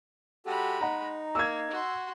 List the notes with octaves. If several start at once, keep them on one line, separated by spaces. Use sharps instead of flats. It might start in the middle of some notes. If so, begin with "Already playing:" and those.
G#3 F#4 G4 A4 B5
D#4 F#5 A#5
A#3 E6 G#6
F#4 C6